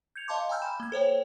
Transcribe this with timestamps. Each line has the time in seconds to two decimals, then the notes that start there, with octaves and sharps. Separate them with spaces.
0.16 G6 G#6 C#7 F7
0.28 D#5 F5 A5 C6 D6
0.49 G5 G#5 A#5 E6 F6 G6
0.62 B5 E7
0.80 A#3 G#6
0.92 A4 C5 C#5 G5